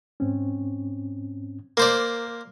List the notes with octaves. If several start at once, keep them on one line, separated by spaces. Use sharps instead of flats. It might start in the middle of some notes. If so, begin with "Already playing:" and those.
G#2 C4 C#4
A#3 A#4 C5 D5